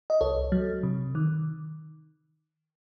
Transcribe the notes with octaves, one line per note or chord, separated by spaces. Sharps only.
D#5
C2 A4 C#5
F#3
C3
D#3